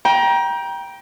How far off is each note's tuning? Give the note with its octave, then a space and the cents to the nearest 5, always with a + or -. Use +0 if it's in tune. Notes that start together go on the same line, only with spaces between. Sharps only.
G5 +0 A#5 +30